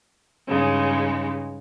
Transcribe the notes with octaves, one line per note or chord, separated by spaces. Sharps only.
G2 C#3 G#3 D#4